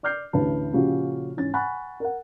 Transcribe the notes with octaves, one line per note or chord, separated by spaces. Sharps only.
D5 D6 F6 G6 C7
A1 D2 B4 A5
A#2 C#3 F3 C#4 F#4 G4
G#2 E3 C#4 A6
F#5 G#5 B5 C#6 F#6 A6
A#4 F#5